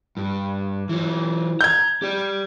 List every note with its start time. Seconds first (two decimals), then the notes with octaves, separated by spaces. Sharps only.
0.17 G2
0.89 E3 F#3
1.61 A#5 G6 G#6
2.02 G4 D5